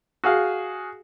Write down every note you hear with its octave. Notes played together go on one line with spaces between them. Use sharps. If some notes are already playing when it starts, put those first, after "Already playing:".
F#4 G#4 F5